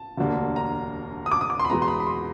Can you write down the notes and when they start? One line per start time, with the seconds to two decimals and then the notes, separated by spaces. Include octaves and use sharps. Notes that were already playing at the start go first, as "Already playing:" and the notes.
Already playing: A5
0.17 E1 D2 D3 G3 A#3
0.56 A#5
1.26 D#6
1.31 D6
1.41 D#6
1.50 D6
1.59 C6
1.65 B5
1.70 E2 B2 G#3 B3 A#5
1.82 C6
1.88 B5
2.00 B5
2.07 C6